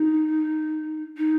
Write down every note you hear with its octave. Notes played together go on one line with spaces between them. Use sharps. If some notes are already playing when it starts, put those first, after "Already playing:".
Already playing: D#4
D#4